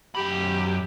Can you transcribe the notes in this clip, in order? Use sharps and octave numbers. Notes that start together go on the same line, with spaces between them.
F#2 G4 B5